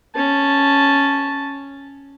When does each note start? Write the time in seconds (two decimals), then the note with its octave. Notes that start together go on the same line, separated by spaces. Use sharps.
0.15 C#4 A5